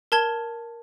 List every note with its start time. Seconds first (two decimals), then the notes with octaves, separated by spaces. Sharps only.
0.12 A#4 A5 G#6 G7